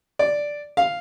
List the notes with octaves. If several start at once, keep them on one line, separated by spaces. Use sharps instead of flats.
D5
F5